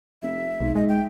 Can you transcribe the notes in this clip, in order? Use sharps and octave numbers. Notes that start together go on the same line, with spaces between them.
F1 E5
B1 G#2
G#3 D#5
G5